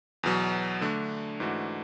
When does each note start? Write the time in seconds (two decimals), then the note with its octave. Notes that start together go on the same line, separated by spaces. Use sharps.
0.23 E2 B2 F#3
0.81 D3 A3 D4
1.40 G#2 E3 A3 D4 F#4